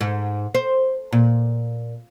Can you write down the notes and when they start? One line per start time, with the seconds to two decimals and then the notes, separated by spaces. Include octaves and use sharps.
0.01 G#2
0.55 C5
1.12 A#2